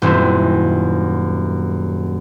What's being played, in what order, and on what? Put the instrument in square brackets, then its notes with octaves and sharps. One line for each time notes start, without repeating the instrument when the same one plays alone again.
[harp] D#1 F#2 C4 E4